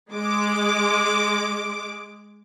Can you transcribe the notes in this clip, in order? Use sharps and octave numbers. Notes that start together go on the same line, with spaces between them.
G#3 D6